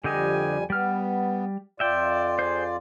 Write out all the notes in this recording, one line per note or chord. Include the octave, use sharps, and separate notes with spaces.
F2 D3 G3 G4 D#5 G#5
G3 B3 F6
F2 F4 D5 E5 G5
G#4 C5